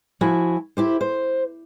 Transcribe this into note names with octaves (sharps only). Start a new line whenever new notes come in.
F3 E4 F#4 G#5
E4 G4 C5
C5